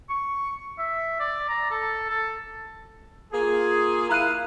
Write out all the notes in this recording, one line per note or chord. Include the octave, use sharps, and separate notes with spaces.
C#6
E5
D5
A#5
A4
A4
A#3 F4 G#4
E4 A#4 F5 A#5 F#6 D#7